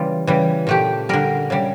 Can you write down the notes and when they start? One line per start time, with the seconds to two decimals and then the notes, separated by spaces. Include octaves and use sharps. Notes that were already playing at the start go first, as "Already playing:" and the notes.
Already playing: C#3 E3 G3 F4
0.27 C#3 E3 G3
0.67 A#2 A3 G4
1.09 D3 G3 A#4
1.50 C#3 G3